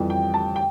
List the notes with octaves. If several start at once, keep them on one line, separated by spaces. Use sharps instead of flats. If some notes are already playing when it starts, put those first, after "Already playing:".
Already playing: F2 E3 G3
G5
A5
G5